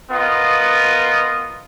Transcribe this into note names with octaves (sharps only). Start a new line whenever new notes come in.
B3 F4 A#4 D#5